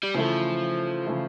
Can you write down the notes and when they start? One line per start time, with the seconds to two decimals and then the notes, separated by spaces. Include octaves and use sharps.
0.03 G3
0.14 C#3 E3 F3 A3 E4 A4
1.06 C#3 E3 A3 E4 A4